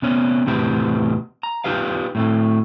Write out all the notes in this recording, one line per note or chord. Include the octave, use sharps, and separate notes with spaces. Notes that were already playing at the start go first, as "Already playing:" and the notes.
C3 B3 C#4
E2 A2 C3 C4 G4 B4
A#5
D#4 F4 G4 B4 F5
A2 A3 C4